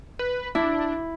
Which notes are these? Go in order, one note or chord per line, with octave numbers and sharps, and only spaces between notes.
B4
D4 E4